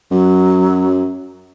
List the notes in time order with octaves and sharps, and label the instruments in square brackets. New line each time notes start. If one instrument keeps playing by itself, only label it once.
[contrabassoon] F#2 [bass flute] F#3